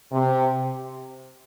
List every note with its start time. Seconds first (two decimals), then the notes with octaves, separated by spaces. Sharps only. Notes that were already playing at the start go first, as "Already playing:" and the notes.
0.12 C3